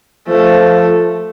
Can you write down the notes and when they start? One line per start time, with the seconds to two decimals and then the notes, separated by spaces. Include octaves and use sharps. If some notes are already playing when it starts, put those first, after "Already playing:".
0.28 F3 A3